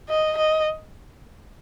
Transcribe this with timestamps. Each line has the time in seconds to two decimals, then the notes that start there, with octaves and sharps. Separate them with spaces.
0.09 D#5
0.37 D#5